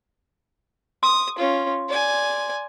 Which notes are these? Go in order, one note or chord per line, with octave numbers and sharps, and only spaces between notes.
C6 D#6
C#4 F4
D5 G#5